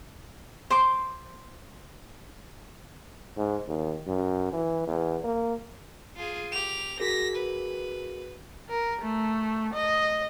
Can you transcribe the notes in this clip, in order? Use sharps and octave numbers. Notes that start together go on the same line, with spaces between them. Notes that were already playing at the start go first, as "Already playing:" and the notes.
C5 C6 D6
G#2
D#2
F#2
E3
E2
A#3
F4 G#4
G4 F7
F#4 G#4 A#4 A#6 B6
B4
A#4
A3
D#5